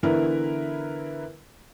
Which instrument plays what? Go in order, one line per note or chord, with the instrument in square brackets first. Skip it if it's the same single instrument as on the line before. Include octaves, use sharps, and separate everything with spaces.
[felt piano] D3 E3 B3 E4 A#4 B4